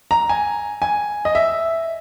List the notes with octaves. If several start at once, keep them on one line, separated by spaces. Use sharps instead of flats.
A#5
G#5
G#5
D#5
E5